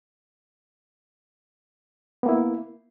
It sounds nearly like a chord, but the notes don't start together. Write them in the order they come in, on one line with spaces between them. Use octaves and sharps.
B3 A#3 E4